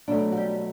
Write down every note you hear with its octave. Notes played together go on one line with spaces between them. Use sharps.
B2 F#3 A3 D4
F#4
G3 G4